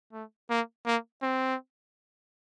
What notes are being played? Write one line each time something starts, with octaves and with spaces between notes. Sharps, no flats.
A3
A#3
A#3
C4